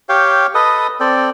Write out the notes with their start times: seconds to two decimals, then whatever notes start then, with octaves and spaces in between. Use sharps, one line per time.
0.09 G4 C#5 F5 G5
0.55 A4 B4 D#5 D#6
1.00 C4 A4 D5 G5